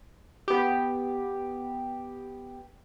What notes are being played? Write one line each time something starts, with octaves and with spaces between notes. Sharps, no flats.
B3 G4